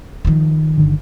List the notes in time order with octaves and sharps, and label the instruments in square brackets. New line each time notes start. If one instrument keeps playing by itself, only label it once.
[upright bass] D#3 F3
[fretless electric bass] G1 D3 D#3